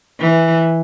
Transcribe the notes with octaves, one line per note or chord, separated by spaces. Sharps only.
E3